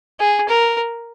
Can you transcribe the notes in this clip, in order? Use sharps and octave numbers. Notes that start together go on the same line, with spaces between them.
G#4
A#4